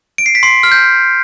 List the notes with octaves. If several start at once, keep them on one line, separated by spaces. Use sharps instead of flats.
D7
C7
B6
C6 C7
F6
G6